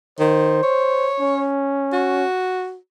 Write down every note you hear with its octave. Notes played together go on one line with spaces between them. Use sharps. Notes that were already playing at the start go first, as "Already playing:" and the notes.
D#3 C5
C#5
C#4
F#4